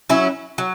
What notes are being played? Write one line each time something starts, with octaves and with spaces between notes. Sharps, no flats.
F#3 C#4 E4
F#3